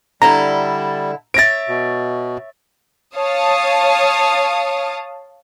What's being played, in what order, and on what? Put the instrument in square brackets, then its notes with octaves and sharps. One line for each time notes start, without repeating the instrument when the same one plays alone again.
[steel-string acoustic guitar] D3 E4 A4 [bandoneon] G3 [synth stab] A#5
[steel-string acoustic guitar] C#5 E5 [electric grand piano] A6 A#6 D7
[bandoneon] B2
[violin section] C#5 F5 A5 D#6